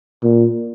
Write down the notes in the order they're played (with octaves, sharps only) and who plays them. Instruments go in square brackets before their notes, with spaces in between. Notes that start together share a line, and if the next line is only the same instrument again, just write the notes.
[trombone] A#2